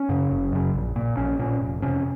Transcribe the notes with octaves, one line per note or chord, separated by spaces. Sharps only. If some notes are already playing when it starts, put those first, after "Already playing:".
Already playing: C#4
F#2 C#3
F#1
F#2 C#3
A#1
A#2
A#1 C#4
A#2 C#4
F1
F2 C3 C#4